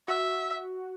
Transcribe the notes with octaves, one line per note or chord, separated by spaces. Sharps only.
F#4 E5